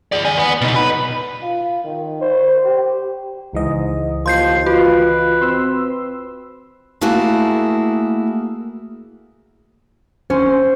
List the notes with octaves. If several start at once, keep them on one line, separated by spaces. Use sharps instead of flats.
G#4 D5
D#3 G#5
B3
B2 D#4
B4
F4
D#3
C5
G4
C#2 G#2 E3 D#5
D#2 F3 C6 G6 C7
F4 F#4 B4
C4 C6 E6
A3 A#3 E4 F#4 G#4
C#4 C5